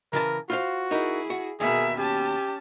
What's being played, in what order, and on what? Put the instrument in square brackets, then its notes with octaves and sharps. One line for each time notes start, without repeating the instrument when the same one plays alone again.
[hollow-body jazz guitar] C#3 E3 A5 [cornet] A#4
[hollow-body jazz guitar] F4 C5 F5 [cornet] F#4
[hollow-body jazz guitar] D#4 A#4 [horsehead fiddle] E4 G#4
[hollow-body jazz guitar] F#4
[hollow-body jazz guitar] D#2 B2 [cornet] G#4 [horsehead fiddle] A#4 E5
[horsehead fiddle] C#4 A5 [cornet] G4